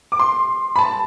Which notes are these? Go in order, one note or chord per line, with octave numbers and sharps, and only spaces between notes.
D6
C6
B5
A5